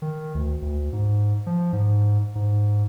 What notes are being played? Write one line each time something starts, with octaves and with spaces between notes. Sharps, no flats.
D#3
D2
D2
G#2
F3
G#2
G#2